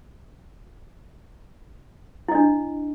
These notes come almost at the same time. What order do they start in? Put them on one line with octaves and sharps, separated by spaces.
E4 D#5 D4